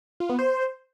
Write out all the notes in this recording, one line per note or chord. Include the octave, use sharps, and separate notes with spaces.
F4
B3
C5